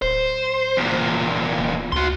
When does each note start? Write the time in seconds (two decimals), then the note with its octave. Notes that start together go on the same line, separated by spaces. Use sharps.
0.02 D1 C5
0.77 E2 A#2
1.92 D2 F#4 C6